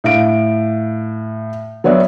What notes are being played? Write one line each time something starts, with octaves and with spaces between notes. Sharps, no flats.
A2 F5 D7
F#3 B3 C#5 D5 E5